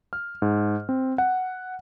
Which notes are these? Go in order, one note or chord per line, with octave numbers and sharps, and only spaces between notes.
F6
G#2
C4
F#5